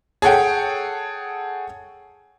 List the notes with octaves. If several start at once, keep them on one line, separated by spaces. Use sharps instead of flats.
G#4 A4 C#5 F#5 G5